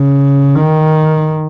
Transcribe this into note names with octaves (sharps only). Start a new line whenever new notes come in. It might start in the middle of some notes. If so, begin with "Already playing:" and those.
Already playing: C#3
D#3